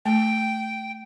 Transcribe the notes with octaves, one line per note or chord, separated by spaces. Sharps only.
A3 G5